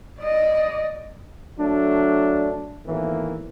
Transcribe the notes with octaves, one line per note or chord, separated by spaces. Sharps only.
D5 D#5
F#3 A3 D4
G#1 E2 A2 E3 A#3